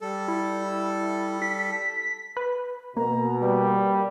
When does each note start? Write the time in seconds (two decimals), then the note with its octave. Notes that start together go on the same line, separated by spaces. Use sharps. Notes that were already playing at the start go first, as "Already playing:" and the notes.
0.01 G3 A4
0.28 E4
1.42 B6
2.37 B4
2.97 B2 A#3 A#5
3.42 G3 B4